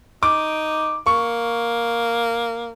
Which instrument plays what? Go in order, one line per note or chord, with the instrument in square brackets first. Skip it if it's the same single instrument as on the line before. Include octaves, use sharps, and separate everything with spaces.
[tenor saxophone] D#4 [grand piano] D6
[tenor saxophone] A#3 [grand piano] C#6